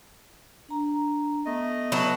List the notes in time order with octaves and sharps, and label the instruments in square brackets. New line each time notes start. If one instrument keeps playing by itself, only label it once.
[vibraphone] D4 A#5
[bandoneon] A3 D#5 [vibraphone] B3
[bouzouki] F#3 B4 A5